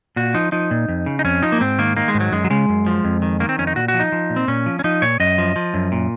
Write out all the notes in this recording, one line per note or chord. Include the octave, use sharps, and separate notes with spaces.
A#2 F#4
F3 D#4
F3 D#4
A#2
F2
C#3
D#4
F2 C#4
F3 D#4
A#3
G#2 C4
D#3 A#3
D#3 A#3
G#3
G#2
F#3
F#2 G#3
F#3
C#3 G#3
F#2
F3
F2
D#3
D#3 A#3
C4
F2 C#4
D#4
A#2 F#4
F#4
F3
D#4
F3
A#2
C4
A#2 C#4
F3
C#4
F3 D#4
A#2 C#5
F#2 D#5
F3
F3
F#2
A#2